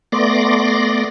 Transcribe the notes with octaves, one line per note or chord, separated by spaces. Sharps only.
A3 B3 D5 C6 D6 A#6